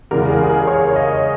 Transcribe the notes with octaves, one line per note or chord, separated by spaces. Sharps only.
E2 C#3 G#3 A#4
G#4
G#4
A#4
C#5
D#5